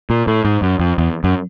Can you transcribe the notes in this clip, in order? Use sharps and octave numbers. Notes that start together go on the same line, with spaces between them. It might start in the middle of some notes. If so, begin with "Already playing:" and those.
A#2
A2
G#2
F#2
F2
E2
F#2